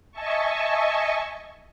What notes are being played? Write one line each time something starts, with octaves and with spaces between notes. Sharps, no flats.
D#5 E5 G#5 A5 C#6